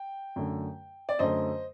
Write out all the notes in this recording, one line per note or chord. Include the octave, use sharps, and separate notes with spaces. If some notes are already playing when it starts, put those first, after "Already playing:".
Already playing: G5
F#2 D3 A3
D5
F#2 D3 A3 C5 D#5